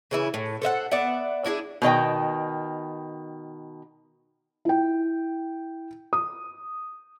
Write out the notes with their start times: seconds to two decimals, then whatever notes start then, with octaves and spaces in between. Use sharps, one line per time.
0.11 C#3 E3 E4
0.34 A2
0.62 A4 C5 E5 F#5
0.91 B3 D5 E5 F#5
1.44 D4 E4 F#4 G#4
1.82 B2 D#3 D#5 G5
4.65 E4 G5
6.13 D#6